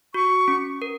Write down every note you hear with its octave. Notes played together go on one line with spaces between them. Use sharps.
F#4 C#6
C#4
A#4